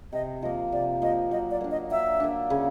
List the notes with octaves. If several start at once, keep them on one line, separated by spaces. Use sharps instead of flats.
C3 D#5
F3 A#3 D#5
C3 D5
F3 A#3 D#5
F#3 D#5
D5
A#3 D4
D#5
F#3 E5
A#3 D4
C#3